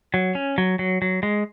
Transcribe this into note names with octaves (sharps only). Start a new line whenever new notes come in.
F#3
C#4
F#3
F#3
F#3
G#3